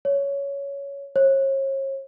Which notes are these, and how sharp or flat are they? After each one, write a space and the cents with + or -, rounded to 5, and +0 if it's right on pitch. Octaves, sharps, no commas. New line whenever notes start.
C#5 +10
C#5 -40